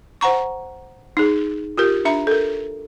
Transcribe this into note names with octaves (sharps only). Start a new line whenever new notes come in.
C5 F#5 A#5 C#6
D#4 G#4
F4 G4 A#4
D4 E5 A#5
A4 A#4